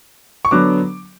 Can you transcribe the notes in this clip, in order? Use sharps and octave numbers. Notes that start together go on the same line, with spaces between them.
C#6
D3 F#3 B3 D4 D6